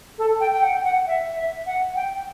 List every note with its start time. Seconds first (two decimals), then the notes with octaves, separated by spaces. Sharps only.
0.18 A4
0.40 G5
0.52 G5
0.63 F#5
0.84 F#5
1.07 E5
1.36 E5
1.66 F#5
1.96 G5